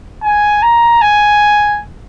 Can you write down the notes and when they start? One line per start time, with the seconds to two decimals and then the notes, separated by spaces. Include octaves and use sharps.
0.23 G#5
0.62 A#5
1.01 G#5